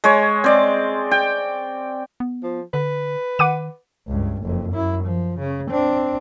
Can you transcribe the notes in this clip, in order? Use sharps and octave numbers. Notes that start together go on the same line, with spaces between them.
G#3 C#5
C4 D5
G5
B3
F3
D3 B4
D#3 F#5 D6 D#7
C#2 G2
F#1 F2
F#2 E4
F3
C#3
C4 D4